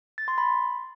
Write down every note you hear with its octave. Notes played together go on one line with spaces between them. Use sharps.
A6
C6
B5